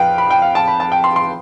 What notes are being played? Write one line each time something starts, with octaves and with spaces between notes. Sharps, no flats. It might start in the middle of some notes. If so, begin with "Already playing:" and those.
Already playing: F2 F3 B4 F5 G5
B5
G5
F5
A5
B5
A5
G5
C6
C6